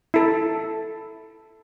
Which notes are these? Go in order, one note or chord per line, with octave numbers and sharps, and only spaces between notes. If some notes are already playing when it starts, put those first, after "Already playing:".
E4 A4